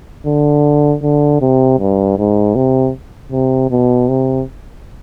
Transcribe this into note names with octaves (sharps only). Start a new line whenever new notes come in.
D3
D3
C3
G2
G#2
C3
C3
B2
C3